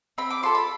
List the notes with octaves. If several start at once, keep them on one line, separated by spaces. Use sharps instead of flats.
C4 B5
D6
F4 A4 C6
B5